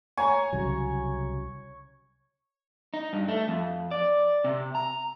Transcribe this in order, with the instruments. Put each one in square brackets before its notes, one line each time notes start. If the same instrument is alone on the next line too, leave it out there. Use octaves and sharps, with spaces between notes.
[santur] C#5 [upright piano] G#5 A#5
[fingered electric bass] C2 C#3 F#3
[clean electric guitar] D#4
G2
A3
F2
D5
C3
A#5